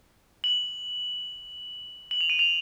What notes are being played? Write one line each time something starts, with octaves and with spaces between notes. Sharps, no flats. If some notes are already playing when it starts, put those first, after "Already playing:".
F#7
F#7
F7
D#7
F7